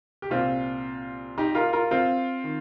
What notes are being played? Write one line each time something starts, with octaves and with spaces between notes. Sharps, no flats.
G4
C2 A#2 C4 F4
D#4 G4
F4 A#4
F4 A#4
C4 F4
D#3